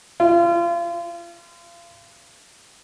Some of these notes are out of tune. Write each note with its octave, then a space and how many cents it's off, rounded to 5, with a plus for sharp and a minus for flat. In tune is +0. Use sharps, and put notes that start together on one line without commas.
F4 -35